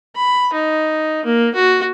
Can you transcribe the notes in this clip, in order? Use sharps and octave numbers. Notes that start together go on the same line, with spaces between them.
B5
D#4
A#3
F#4